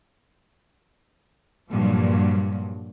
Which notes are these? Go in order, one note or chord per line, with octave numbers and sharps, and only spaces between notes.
G2 A#2 F3 F#3